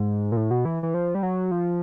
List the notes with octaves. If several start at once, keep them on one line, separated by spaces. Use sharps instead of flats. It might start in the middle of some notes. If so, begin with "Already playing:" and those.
Already playing: G#2
A#2
A2
B2
E3
E3
F3
G3
F#3
F3